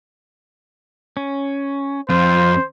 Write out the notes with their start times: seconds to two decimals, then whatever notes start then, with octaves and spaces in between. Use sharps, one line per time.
1.17 C#4
2.09 F2 F4 C5